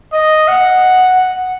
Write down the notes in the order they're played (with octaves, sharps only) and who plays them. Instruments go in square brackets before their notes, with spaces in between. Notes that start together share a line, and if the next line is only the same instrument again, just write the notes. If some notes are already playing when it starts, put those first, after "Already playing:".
[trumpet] D#5
F#5